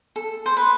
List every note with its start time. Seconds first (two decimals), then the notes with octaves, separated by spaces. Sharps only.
0.16 A4
0.46 C5
0.57 B4